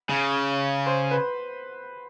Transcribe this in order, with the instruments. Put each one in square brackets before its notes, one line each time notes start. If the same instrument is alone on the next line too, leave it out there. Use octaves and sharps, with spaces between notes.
[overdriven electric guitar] C#3
[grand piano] C5
B4